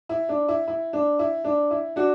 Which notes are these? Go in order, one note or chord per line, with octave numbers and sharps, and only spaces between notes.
E4
D4
E4
E4
D4
E4
D4
E4
D4 F#4